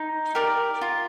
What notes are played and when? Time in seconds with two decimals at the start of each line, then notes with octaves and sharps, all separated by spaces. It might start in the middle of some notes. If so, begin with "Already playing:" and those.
Already playing: D#4
0.35 G4 A#4 D5
0.81 F4